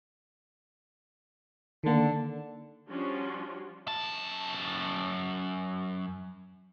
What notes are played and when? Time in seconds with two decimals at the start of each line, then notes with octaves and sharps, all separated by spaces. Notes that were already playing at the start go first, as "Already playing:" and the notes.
1.84 D3 D#3 A#3
2.89 F3 G3 C#4 D4 F4 F#4
3.88 F#2 A5